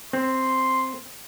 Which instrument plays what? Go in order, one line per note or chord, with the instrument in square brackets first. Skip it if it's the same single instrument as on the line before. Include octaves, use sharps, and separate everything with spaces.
[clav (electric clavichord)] C4 [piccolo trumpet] C6